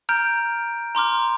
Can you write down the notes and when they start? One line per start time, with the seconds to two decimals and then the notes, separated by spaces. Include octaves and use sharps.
0.09 A#5 F6 G6 D7
0.95 A#5 C6 D6 F6